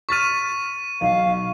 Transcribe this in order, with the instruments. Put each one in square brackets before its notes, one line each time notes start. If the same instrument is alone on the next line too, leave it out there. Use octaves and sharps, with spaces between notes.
[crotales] C#6 D#7 [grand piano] F6 A6 B6
[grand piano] B1 [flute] F5